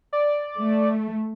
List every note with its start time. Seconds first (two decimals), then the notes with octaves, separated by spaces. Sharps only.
0.13 D5
0.58 A3